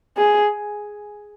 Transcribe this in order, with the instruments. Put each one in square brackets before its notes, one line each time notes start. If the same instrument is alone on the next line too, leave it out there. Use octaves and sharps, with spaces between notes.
[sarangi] G#4